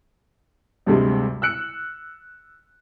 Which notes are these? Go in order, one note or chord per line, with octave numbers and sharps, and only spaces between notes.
D2 G2 C3 G3 G#3
E6 F#6 C#7